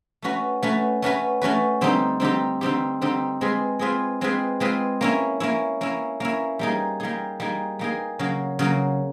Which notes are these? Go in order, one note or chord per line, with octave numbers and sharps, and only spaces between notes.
A3 C#4 F#4 B4
A3 C#4 F#4 B4
A3 C#4 F#4 B4
A3 C#4 F#4 B4
D3 G3 C4 D#4 G4
D3 G3 C4 D#4 G4
D3 G3 C4 D#4 G4
D3 G3 C4 D#4 G4
G#3 C4 F4 G#4 B4
G#3 C4 F4 G#4 B4
G#3 C4 F4 G#4 B4
G#3 C4 F4 G#4 B4
A#3 C#4 E4
A#3 C#4 E4
A#3 C#4 E4
A#3 C#4 E4
G3 A#3 D#4 G#4
G3 A#3 D#4 G#4
G3 A#3 D#4 G#4
G3 A#3 D#4 G#4
C#3 F#3 A#3
C#3 F#3 A#3